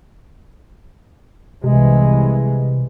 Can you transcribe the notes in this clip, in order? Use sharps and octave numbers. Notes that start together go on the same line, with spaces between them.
C2 C3 E3 G#3